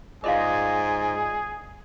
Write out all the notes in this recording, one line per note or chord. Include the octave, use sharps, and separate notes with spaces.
G#2 F4 G#4 D5 D#5 F5 C6 D6